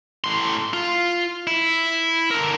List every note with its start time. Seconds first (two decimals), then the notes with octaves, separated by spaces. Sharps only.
0.24 A2 C6
0.73 F4
1.47 E4
2.31 D3 A#4